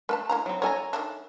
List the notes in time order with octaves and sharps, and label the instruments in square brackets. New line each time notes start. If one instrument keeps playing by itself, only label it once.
[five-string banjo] A3 [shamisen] A#4 B4 A5
[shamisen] A#3 E4 A#5
[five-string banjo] F#3 C4
[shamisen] A4 A#4 [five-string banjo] C#5 G#5 A#5
[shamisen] D#3 A3 D4